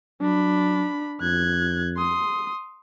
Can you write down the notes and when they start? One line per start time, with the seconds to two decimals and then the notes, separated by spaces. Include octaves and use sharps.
0.21 F#3 D4 B5
1.21 F2 F#6 G#6
1.97 C6 D#6